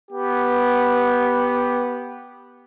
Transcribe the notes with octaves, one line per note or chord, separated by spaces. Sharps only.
B3 G4